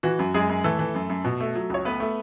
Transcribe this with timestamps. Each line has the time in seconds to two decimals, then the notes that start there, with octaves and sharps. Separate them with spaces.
0.03 E3 F#4
0.19 F#2
0.34 F#2 G#3 G#4
0.49 F#2
0.64 E3 A3 A4
0.79 E3
0.95 F#2
1.10 F#2
1.25 B2
1.40 A3
1.55 F#3
1.70 C#2 C#5
1.85 A3 B3 B4
2.00 A3